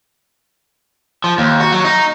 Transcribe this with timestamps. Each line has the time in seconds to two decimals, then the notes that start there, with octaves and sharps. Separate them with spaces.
1.24 F3
1.38 D#2
1.60 F#4
1.72 F#3
1.85 D#4